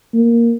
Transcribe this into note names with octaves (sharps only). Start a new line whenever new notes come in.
A#3